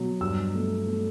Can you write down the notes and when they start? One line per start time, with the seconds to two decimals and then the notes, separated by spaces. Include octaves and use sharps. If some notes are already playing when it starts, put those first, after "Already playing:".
Already playing: B2 F#3
0.21 G2 E6
0.54 A3
0.87 A3